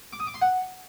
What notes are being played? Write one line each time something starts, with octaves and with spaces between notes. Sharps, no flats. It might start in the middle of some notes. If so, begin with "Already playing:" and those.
D6
D#6
D6
C6
F#5